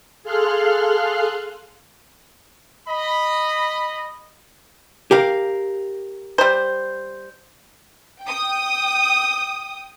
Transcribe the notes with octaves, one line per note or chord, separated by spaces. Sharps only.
G#4 A4 F5 C6 F6 F#6
D#5 B5
G4 A#4 F5
G3 C5
G5 D#6